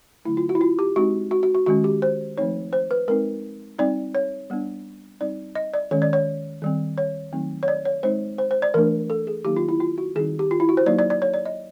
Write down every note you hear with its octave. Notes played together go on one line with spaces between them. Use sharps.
D3 F#3 A3 E4
F4
F#4
E4
F4
G4
G#3 C4 D#4 F#4
F#4
F#4
F#4
D#3 G#3 C#4 F#4
G4
C5
F3 A3 C4 D#4 C#5
C5
B4
G#3 C4 D#4 A#4
G3 C4 D#4 D5
C#5
G3 B3 D4
G3 C4 D#4 D5
D#5
D5
D#3 G#3 C#4 C#5
D5
C#5
D#3 G3 C4
C#5
D#3 F#3 A3 C4 D#4
C#5
D5
C#5
G#3 C4 D#4 C5
C5
C5
D5
E3 A3 D4 A#4
A4
G#4
D#3 F#3 A#3 D#4 G4
F4
E4
F4
F#4
D#3 G3 C4 D#4 G#4
G4
F4
E4
F#4
C5
F#3 A#3 D#4 D5
D5
D5
C#5
D5
D#5